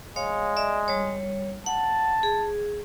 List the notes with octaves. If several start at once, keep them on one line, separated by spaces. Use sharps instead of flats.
G#3 C#5 F5
D5 E5
G3 C#5
F#5 A5
G#4